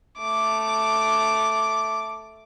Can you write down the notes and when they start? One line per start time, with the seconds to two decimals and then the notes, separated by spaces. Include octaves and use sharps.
0.18 A3 D6